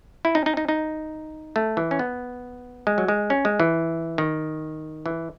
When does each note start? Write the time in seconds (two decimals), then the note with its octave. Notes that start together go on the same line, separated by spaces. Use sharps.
0.25 E4
0.35 D#4
0.46 D#4
0.57 D#4
0.69 D#4
1.56 A3
1.77 E3
1.91 C#4
1.99 B3
2.87 G#3
2.98 F#3
3.08 G#3
3.30 C#4
3.45 G#3
3.60 E3
4.18 D#3
5.06 E3